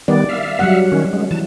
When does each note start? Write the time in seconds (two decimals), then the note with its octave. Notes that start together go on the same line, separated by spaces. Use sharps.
0.08 D#3 G3 B3 D5
0.29 E5 F5
0.59 F#3 G3 F#5
0.92 D#3 C#4
1.13 G#3
1.31 E3 A5